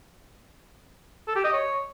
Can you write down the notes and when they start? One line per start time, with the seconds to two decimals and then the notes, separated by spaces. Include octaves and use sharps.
1.28 A4
1.36 G4
1.44 D#5
1.53 C#5